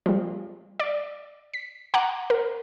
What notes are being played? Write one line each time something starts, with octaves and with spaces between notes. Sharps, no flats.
F3 G3
D5
B6
F#5 G#5 A#5 D6 F#6
A#4